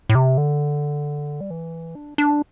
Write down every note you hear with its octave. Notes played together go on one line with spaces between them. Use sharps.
A2
C3
D3
G3
E3
D4
D4